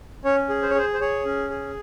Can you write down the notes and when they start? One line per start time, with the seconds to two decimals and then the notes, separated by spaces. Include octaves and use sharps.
0.24 C#4 C#5
0.49 G#4
0.62 C5
0.70 C#5
0.75 G#4 C5
0.94 C5
1.01 G#4 C#5
1.25 C#4
1.50 G#4